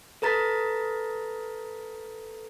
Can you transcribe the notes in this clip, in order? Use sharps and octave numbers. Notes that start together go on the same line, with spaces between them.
A4 B4 A#5 A6 B6